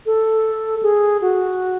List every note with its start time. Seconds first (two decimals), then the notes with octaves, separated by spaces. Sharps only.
0.06 A4
0.83 G#4
1.22 F#4